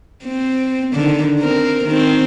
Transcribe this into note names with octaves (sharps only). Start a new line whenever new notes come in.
C4
D3 D#3
C4 A#4
D#3 C4